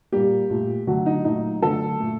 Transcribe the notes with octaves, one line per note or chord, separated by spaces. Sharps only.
A#2 G3 A#3 G4
A#2 A3
D3 F#3 A3 F#4
D#4
A#2 F#3 A3 D#4
D3 F#3 A3 A4
A#2 A3